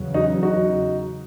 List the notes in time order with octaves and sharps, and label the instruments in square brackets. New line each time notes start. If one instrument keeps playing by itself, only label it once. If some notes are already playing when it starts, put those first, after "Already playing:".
Already playing: [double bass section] E2 C#3 F#3
[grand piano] D#4 F#4
D#4 F#4